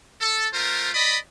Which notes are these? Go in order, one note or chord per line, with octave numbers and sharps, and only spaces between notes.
A4
A3 F4 A#4 C5
D5 D#5 B5